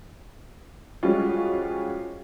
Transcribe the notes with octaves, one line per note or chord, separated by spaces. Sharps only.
F3 G3 G#3 C#4 F4 F#4